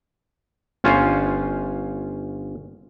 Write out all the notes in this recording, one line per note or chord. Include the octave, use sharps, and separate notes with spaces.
G1 C#4 F4 C5 F5 G#5